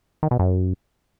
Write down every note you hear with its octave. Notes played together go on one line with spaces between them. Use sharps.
D#3
B2
F#2